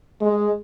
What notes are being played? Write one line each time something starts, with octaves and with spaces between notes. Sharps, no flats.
G#3